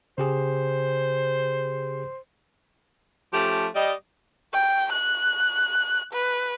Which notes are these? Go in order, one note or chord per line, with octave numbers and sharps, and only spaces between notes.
C#3 G4 G#4 C5
F3 A3 C#4 G4
G3 D#5
G5
F#6
B4